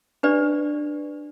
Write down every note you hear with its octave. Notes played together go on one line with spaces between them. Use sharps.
D4 G4 B4 D5